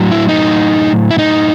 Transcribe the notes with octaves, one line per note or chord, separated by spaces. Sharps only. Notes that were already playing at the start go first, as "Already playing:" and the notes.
Already playing: A2 F#3
E4
D#4
E4
D#4